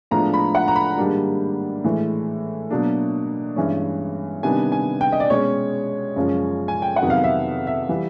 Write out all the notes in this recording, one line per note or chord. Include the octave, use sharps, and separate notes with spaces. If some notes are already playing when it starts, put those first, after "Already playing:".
A2 F3 G#3 B3 D4 A#5
B5
F#5
A#5
B5
G#2 D#3 G3 A#3 D4
A2 E3 G#3
B2 F#3 A#3 D4
G2 E3 G#3 C#4
C3 D#3 G3 B3 D4 G#5
G#5
G5
D#5
D5
B2 G#3 C#4 C#5
F#2 C#3 F3 G#3
G#5
G5
F#5
F2 C3 D#3 F#3 B3
F5
E5
E5
E3 G3